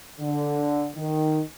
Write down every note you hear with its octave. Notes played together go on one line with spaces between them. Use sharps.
D3
D#3